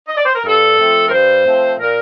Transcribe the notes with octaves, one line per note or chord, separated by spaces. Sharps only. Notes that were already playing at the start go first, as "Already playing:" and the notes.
D#5
D5
C5
A#4
G2 A4
F3 A3 C4
A#4
G2 C5
F3 A3 C4
A#2 A#4